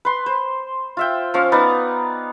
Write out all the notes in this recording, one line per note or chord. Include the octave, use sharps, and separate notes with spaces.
B4 C6
C5
F4 E5 G5
F3 C#4 F5
B3 D#4 B4 D5